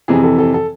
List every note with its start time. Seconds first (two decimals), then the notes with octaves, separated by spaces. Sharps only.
0.08 F2 C3 E3 G#4
0.24 A4
0.38 A4
0.54 A4